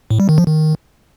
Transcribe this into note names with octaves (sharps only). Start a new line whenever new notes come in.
A2
G3
D#3
F3
D#3